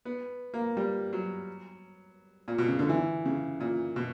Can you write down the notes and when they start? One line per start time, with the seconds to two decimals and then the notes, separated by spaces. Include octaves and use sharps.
0.05 B3
0.54 A#3
0.77 G3
1.13 F#3
2.48 A#2
2.58 B2
2.68 C#3
2.79 D3
2.89 E3
3.25 C#3
3.60 A#2
3.96 B2